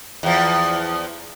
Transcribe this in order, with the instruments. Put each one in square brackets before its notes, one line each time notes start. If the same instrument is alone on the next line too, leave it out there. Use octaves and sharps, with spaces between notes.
[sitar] E2 F3